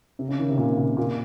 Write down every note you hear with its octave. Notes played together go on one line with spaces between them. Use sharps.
C3
C#3
D#3
C3
A#2
A#2
A#2